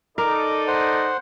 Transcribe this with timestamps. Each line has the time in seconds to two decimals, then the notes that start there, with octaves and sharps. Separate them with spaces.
0.18 D#4 A4 A#4 D5 D6
0.68 C5 F#5